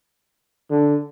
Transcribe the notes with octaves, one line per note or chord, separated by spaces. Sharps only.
D3